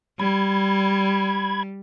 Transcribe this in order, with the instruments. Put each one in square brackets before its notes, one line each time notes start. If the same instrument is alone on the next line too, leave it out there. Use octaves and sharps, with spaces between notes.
[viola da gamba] G3 [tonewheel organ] B5 G#6